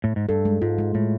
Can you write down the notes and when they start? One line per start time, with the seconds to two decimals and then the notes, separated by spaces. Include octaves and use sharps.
0.04 A2
0.16 G#2
0.29 G2 A4
0.45 G#3
0.62 G#2 F4
0.78 G#3
0.95 A2 G#3